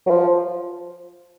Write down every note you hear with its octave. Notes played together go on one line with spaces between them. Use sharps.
F#3
F3